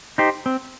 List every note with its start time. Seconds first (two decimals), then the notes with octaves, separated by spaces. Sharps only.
0.18 D#4 G4 C5
0.46 C4